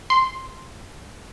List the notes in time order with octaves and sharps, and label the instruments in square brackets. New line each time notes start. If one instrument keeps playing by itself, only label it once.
[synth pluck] C6